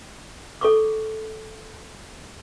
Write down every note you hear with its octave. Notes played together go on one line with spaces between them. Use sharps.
A4 C#6 D6